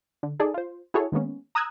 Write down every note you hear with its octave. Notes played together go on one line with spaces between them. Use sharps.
D3
D#4 G#4 A4 D5
F4 C5
E4 F#4 G#4 A4 C#5
D#3 G#3 A#3 B3 C#4
A#5 D#6 E6 F#6 G#6